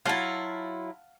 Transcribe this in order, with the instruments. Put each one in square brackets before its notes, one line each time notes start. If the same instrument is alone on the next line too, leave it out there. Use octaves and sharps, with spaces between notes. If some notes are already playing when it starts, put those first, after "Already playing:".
[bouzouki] F#3 E4 [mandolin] F4 [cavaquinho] F5 F#5 A5